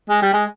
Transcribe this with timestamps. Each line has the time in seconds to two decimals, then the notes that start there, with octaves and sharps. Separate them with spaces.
0.10 G#3
0.22 G3
0.34 G#3